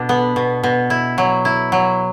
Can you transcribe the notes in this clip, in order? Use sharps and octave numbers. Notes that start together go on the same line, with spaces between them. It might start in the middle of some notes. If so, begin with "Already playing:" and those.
Already playing: B2 D4
B3
B2
B2
E4
F#3
E4
F#3